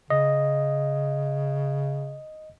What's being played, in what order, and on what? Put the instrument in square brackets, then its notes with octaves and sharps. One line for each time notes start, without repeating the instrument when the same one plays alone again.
[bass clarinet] C#3 [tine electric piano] D#5